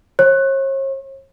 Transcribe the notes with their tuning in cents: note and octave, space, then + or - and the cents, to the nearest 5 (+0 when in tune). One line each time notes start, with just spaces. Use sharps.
C#5 -45